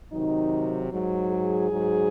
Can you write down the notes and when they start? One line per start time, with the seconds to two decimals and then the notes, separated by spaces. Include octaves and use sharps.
0.12 C3 D#3 F#3 D#4
0.91 G#2 F#3
1.31 G#4
1.70 G#2 F#3